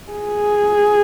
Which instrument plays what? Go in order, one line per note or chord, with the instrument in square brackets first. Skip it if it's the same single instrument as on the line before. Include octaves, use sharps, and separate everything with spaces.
[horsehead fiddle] G#4